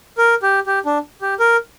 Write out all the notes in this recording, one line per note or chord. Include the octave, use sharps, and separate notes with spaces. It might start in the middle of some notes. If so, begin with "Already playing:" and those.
A#4
G4
G4
D4
G4
A#4